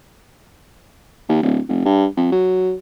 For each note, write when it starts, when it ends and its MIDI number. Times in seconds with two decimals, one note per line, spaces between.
1.29 1.41 39
1.42 1.59 26
1.69 1.83 29
1.85 2.05 43
2.17 2.27 41
2.32 2.73 54